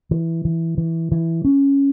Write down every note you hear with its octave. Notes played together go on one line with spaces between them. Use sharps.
E3
E3
E3
E3
C#4